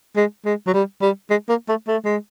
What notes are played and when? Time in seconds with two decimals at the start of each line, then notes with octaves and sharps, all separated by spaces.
0.16 G#3
0.45 G#3
0.67 F#3
0.74 G3
1.02 G3
1.30 G#3
1.49 A#3
1.69 A3
1.88 A3
2.05 G#3